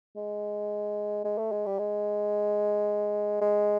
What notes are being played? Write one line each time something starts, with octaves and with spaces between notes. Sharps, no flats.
G#3
G#3
A3
G#3
G3
G#3
G#3